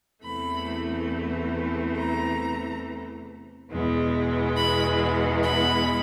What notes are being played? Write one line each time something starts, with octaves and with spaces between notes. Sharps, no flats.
E2 C3 E3 A3 B5
A#5
E2 B2 G#3
B5
B5